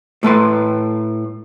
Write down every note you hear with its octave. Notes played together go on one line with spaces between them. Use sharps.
A2 A3 B4 C6